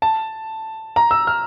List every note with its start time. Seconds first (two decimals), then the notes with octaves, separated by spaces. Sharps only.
0.02 A5
0.96 A#5
1.11 E6
1.27 F6